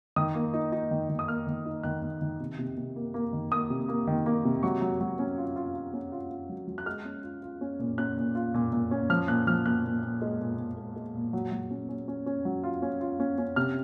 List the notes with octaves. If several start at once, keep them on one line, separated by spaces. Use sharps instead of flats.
D#3 D#6
A#3
D#4
D#4
D#3
D#3
D#6
A#3 F6
D#3
D#4
D#3 F#6
D#3
D#3
C3
C3
C3
A#3
A#3
D#3
A#3 D#6
C3
A#3
D#3
A#3
C3
F#3 C#6
F#3
F#3
C#4
F4
F4
F4
C#4
F4
F4
F#3
F#3
F#6
G#3 F6
C#4
F4
F4
C#4
A#2
C#4 F#6
A#2
F4
A#2
A#2
C#4
F3 F6
A#2 F#6
F3 F6
A#2 F#6
A#2
A#2
G#3
A#2
A#2
G#3
G#3
A#2
F#3
F#3
C#4
C#4
C#4
C#4
F#3
F4
C#4
F4
C#4
C#4
C3 F6